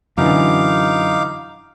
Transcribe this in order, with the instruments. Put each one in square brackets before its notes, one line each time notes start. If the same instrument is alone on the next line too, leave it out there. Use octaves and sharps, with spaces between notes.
[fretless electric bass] F#2 [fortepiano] B2 D3 E3 [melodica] D#4 F5 D6